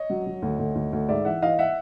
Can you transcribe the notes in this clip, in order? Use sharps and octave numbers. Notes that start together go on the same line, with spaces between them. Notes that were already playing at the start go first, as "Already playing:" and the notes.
Already playing: C#5 D#5
F#3
F#3
D2
D2
D2
D2
G#2 D5 E5
E3 E5 F#5
E3 D#5 F5
E5 F#5